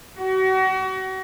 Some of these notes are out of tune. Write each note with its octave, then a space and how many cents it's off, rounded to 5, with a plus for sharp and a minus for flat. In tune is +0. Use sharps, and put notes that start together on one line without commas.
F#4 +35